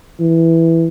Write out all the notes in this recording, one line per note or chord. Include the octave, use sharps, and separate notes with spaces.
E3